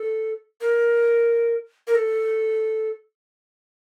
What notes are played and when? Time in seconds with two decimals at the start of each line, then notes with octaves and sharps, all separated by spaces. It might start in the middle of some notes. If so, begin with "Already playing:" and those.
Already playing: A4
0.61 A#4
1.87 A#4
1.95 A4